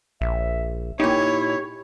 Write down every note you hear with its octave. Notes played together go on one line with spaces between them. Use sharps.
A#1 E5
A#2 D#4 E4 G4 C#5